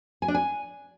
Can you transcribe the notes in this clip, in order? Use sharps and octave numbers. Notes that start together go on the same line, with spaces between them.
G#5
D4
G#5